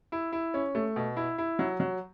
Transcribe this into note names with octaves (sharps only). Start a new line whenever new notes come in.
E4
E4
C#4
A3
B2
E4
E4
F#3
F#3